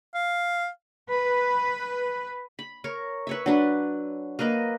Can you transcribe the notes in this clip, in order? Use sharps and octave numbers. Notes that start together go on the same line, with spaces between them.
F5
B4
B5
A#4 C#5
B4 C#5 E5
F#3 D4 B4
A#3 A#4 B4 D#5